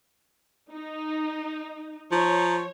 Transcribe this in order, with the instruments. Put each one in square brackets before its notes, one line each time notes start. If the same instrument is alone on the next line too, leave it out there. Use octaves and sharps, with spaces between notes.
[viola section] D#4
[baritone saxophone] F3 [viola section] C#5 [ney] A#5